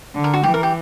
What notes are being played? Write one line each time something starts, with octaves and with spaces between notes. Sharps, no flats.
D3
A#4
F#4
E3 G4
A#4
G4